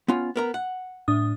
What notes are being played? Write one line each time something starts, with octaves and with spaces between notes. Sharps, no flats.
B3 C#4 F4
B3 A#4 A#5
F#5
A2 D4 D#6